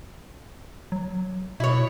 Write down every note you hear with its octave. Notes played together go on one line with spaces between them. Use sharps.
F#3
B2 E4 C#5